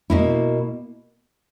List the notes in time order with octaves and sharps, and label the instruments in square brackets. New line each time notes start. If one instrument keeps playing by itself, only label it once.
[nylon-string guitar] B2 A#3 E4